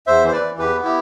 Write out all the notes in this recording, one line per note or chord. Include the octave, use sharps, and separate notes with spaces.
E2 C5 E5
E3 C5
B4 D5
E3
E2 G4 B4
B3
E4 G4